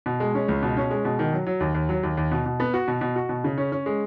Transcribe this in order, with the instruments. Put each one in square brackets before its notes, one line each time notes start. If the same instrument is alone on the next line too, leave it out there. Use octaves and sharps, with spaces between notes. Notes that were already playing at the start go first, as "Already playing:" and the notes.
[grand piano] B2
G#3
C#4
C#2
B2
C#4
G#3
B2
D#3
F#3
F#3
D#2
D#2
F#3
D#2
D#2
B2
B2
B3
F#4
B2
B2
F#4
B2
C#3
C#4
C#4
G#3